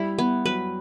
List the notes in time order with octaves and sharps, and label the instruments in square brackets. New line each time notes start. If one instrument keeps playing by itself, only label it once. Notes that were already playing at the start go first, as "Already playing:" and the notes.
Already playing: [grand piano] G3 [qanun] E4
[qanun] B3
[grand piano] F#3 [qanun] B4